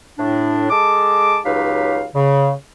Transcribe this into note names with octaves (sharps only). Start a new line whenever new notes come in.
A2 D4
G#3 A4 A5 D6
C#2 F#3 D#4 G4 B4 F5
C#3